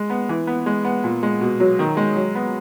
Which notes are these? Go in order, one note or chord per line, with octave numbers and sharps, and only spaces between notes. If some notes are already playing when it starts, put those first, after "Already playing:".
Already playing: G#3
B3
E3
B3
G#3
B3
A#2
G#3
B2
F#3
D#3
G#3
F#3
B3